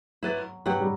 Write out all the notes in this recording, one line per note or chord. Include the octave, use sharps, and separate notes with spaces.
F#3 E4 B4 D5
F#3 G4 B4 F#5
G3